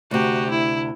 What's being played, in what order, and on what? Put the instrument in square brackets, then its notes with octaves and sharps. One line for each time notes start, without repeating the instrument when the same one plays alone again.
[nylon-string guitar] D2 C3 [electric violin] F#4 G4
[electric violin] E4